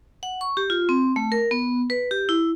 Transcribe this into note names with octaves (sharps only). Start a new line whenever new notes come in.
F#5
C#6
G4
F4
C4
A3
A#4
B3
B4
G4
E4